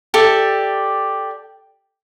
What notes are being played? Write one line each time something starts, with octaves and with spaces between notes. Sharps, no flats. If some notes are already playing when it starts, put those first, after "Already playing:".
G4 A4 D5 E5